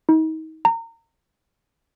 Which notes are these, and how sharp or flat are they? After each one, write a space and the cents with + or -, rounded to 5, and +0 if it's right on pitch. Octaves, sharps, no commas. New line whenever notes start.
D#4 +35
A#5 -30